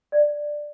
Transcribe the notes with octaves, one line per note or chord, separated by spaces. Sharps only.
D5